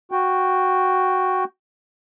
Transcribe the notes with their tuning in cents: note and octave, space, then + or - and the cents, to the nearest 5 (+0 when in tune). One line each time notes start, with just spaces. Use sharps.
F#4 +0 G5 +0